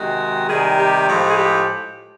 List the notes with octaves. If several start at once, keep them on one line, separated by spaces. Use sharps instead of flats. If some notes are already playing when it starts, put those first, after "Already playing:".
Already playing: C3 D#3 G#3 F#4
C3 D#3 G3 G#4
G4
A2 F3 G#3
G#4
G4